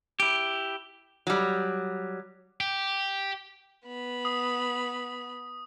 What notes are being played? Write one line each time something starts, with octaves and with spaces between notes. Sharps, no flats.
E4 G4
F#3 G3
G4
B3 B5
D#6